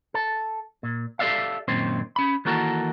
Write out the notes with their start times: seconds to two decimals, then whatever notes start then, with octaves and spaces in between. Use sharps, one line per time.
0.14 A4
0.83 A#2
1.19 G4 A4 C#5 D5 E5 F5
1.68 F#2 A#2 D#3 C4 C5
2.16 C#4 B5
2.45 D#3 E3 A#3 F#4 A4 A#4